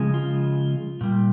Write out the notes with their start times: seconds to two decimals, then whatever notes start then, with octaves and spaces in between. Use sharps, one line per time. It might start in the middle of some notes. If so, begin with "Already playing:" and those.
Already playing: C#3 F3 G#3
0.14 F4
1.01 A#2 G3